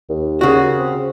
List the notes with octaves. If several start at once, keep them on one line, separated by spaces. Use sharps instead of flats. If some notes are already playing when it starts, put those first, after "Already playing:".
D#2
C#3 F#4
C4